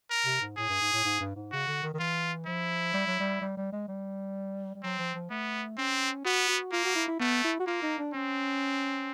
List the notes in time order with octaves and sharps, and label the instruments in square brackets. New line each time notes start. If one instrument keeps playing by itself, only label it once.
[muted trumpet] A#4
[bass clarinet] C3
G#2
[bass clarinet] A2 [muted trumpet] G#4
[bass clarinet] G2
G#2
A2
G#2
G2
G#2
[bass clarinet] C#3 [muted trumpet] F#4
[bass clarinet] D3
D#3
D#3
[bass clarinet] E3 [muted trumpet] F4
[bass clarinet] F3 [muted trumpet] E4
[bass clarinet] G3
F#3
G3
G3
G3
G#3
G3
G3
[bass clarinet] F#3 [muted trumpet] C4
[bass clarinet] F3
F3
[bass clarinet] A3 [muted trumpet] B3
[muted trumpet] C4 [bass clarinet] C#4
[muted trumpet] B3 [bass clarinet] F#4
[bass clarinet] F#4
[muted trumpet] A#3 [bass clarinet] F4
[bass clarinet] F#4
E4
E4
[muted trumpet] A3 [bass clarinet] B3
[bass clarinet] E4
F#4
[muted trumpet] A#3 [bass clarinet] F4
[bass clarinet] D#4
D4
[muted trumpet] C4 [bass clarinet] C#4